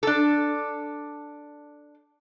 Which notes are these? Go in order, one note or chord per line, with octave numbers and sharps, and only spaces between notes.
D4 A4